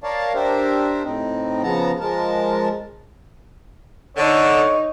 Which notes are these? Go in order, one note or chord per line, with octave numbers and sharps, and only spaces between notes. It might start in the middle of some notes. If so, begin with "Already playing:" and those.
A#4 C#5 D5 F5 A5
D4 G4 A#4 C5 E5
A2 C4 D#4
C#3 F3 B3 A5 A#5
F3 G#3 A#4 A5
D3 D#4 C#5